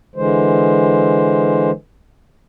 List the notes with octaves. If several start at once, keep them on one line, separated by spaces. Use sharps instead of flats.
D3 E3 G#3 C5